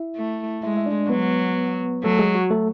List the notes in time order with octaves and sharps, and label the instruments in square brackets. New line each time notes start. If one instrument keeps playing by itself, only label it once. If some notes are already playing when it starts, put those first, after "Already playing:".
Already playing: [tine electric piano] E4 E5
[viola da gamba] A3
[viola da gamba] G#3 [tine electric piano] E4 E5
[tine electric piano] E5
D4 D5
[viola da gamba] F#3 [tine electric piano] B3 B4
[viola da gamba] F#3 [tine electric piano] A3 A4
[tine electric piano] G#3 G#4
F#4
A3 A4